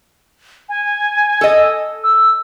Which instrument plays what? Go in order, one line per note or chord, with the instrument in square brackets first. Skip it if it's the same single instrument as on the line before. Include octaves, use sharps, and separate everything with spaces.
[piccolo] G#5
[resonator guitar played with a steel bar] A4 D#5
[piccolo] E6